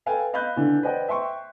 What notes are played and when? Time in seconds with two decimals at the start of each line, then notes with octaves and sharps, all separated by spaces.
0.06 A4 B4 F5 G5 G#5
0.33 D#5 F5 B5 F#6 G6
0.56 D3 E3
0.83 B4 C5 D5 D#5 F#5 G5
1.08 E5 G5 C6 C#6